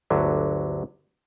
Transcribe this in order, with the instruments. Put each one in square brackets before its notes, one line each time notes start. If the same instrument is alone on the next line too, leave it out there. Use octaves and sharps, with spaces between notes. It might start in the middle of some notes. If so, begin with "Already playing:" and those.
[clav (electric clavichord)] G1 D2 D3 F#3